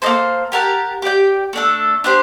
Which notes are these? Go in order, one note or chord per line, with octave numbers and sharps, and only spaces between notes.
A#3 D#4 A4 C5
G4 A#4 F#5 A5
G4 D5 G5
A3 D4 A4
D4 G4 C5